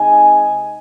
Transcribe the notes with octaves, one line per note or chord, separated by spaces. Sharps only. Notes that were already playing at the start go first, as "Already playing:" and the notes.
Already playing: C3 G#3 D#4 D#5 G#5